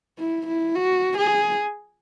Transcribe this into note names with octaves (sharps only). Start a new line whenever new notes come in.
E4
E4
F#4
G#4